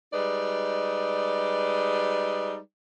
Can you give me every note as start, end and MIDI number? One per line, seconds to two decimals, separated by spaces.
0.13 2.57 55
0.13 2.57 56
0.13 2.57 63
0.13 2.57 71
0.13 2.57 74